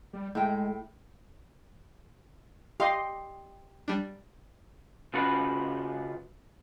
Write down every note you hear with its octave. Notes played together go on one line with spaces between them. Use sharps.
G3
A2 G#3 G5
G4 D#5 F5 C6
G3 D4
C#3 F4 F#4 B4